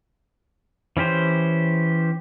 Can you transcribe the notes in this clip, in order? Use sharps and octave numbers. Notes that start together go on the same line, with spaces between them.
E3 C#4 G4 C5